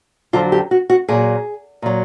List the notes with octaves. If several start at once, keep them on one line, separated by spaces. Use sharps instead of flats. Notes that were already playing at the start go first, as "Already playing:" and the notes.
F2 D3 F#3 F4
G4
F#4
F#4
A#2 F#3 G#4
A#2 F#3